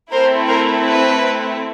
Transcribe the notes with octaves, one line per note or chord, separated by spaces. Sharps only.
A3 C4 E4 A#4 C5
A#4 C5
B4